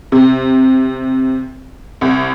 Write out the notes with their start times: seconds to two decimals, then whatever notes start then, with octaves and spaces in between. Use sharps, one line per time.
0.12 C3
2.01 C2